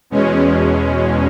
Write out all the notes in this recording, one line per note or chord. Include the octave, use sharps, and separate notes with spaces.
E2 B2 G#3 C#4